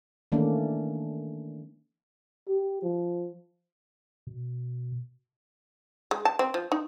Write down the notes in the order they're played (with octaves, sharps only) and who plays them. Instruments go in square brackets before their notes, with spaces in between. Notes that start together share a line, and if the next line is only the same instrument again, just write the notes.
[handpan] D#3 E3 A3 A#3 C#4 D4
[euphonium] G4
F3
[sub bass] B2
[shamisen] G#3
A5
C4
F3
D#4